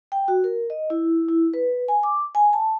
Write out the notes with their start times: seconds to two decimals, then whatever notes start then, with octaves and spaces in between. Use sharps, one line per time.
0.12 G5
0.28 F#4
0.44 A#4
0.70 D#5
0.90 E4
1.29 E4
1.54 B4
1.88 G#5
2.03 D6
2.35 G#5
2.53 A5